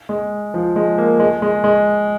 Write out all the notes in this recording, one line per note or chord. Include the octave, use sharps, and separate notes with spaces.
G#3
F3
G#3
A#3
G#3
G#3
G#3